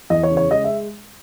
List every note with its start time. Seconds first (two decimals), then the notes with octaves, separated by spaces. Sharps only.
0.10 E2 D#5
0.23 C#5
0.31 C#3
0.37 C#5
0.51 G#3 D#5
0.64 E5